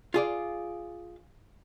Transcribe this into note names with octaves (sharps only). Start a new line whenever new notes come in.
F4 G#4 D5